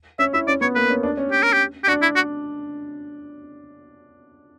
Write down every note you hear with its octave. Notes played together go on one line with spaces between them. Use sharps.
C#4 E5
E4 E5
C#4 D5
B3 C#5
A#3 B4
C#4
D4
C#4
G4
A#4
G4
G4
D4 F#4
E4
F#4